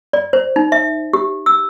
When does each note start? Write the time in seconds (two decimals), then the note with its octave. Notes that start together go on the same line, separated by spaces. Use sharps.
0.13 D5
0.33 C5
0.56 D#4
0.72 E5
1.13 G4
1.46 E6